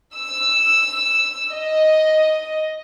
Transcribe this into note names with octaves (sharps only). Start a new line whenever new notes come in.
E6
D#5